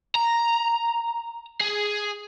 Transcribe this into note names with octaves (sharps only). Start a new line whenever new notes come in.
A#5
G#4